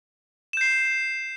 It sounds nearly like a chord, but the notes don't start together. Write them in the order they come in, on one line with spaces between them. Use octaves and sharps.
E7 G6 C7